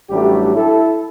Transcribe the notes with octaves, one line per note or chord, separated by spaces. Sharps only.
A1 F#3 G3 A3 D4 G4
E4 A4